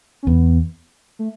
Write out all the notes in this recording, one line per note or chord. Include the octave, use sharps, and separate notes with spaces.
C#4
E2 B3
A3